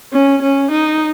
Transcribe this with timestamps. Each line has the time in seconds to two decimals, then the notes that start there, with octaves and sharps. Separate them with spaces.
0.13 C#4
0.42 C#4
0.71 D#4